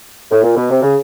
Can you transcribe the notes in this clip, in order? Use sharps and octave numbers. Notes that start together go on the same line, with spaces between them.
A2
A#2
B2
C3
C#3